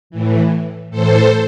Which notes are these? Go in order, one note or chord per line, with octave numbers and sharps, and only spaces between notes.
A2 E3
A2 E3 A4 C5